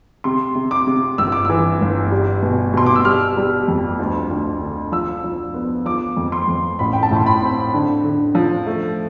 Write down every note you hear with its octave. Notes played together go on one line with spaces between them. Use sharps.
C3 C6
C3
D6
C3
G1 E6
D6
E3 E6
G1
G3
B2
B2 C6
D6
E6
G3 F6
G3
F2
D2
D2
D3
F3 E6
F3
B3
F3 D6
F2
C6
F2
A1 B5
G5
A5
A2
C6
B5
C4
D3
D3
F3
A3